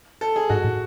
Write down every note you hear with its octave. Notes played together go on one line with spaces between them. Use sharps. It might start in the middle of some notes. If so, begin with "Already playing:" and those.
A4
G#4
G#2 F#4
A2